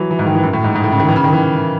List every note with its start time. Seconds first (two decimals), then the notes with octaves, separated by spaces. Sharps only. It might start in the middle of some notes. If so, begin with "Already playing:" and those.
Already playing: E3 F#3
0.11 E3
0.19 G#2
0.26 D#3
0.35 E3
0.43 F#2
0.53 A2
0.64 G#2
0.75 G#2
0.84 A2
0.92 C#3
0.99 D#3
1.09 E3
1.16 C#3
1.24 D#3
1.33 E3